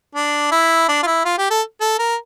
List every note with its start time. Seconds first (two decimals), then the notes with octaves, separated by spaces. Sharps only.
0.15 D4
0.52 E4
0.88 D4
1.03 F4
1.06 E4
1.25 F4
1.38 G4
1.50 A4
1.81 A4
1.99 A#4